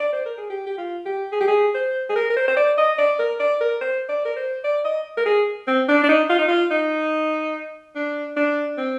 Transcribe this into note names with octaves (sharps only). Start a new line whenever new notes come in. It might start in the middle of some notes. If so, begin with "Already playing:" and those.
D5
C5
A#4
G#4
G4
G4
F4
G4
G#4
G4
G#4
C5
G#4
A#4
A#4
C5
C5
D5
D#5
D5
A#4
D5
A#4
C5
D5
A#4
C5
D5
D#5
A#4
G#4
C4
D4
D4
D#4
F4
D#4
F4
D#4
D4
D4
C4